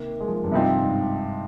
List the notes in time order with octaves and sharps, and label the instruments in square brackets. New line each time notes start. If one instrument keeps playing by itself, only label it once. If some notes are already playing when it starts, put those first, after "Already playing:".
Already playing: [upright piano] C3 D#3 [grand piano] A#3
[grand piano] G#3
F3
G2
[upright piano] C3 F3 C4 D#4
[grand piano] G#2